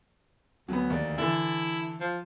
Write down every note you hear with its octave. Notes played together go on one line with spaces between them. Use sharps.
D2 F#3 B3
D#2 D5
D3 E3 E4 A4
F3